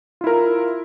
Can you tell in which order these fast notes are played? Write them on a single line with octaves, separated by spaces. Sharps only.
F4 E4 A#4